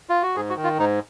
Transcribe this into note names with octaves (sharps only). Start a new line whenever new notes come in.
F4
F#4
G#2 G#4
F#4
D#3
F4
G#2 D#4